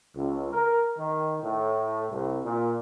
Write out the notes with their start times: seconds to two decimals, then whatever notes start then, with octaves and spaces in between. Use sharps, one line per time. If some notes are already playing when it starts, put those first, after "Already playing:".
0.16 C#2
0.53 A#4
0.99 D#3
1.43 A2
2.11 C2
2.45 A#2